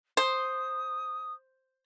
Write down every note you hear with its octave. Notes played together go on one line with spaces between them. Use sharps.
C5 D#6